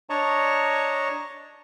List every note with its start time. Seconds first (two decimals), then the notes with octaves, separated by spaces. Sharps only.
0.10 D4 C#5 D#5 A5 A#5 C#6